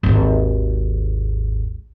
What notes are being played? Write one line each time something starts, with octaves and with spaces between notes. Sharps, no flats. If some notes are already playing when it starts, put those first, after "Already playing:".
G#1 D#2